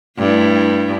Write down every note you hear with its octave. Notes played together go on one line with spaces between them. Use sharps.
G2 A3 E4